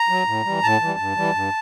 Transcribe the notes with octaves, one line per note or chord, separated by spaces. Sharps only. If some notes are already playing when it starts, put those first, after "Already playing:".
Already playing: A#5
F#3
A2
E3 G3
A2 A5
E3 G3
G2
E3 G3
G2